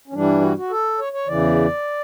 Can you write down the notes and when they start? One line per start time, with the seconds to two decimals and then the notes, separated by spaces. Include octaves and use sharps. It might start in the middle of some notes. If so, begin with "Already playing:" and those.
0.08 C#4
0.13 G2 E3 G3 D4
0.41 F#4
0.57 F#4
0.70 A4
0.99 C#5
1.13 C#5
1.27 E2 C#3 E3 D5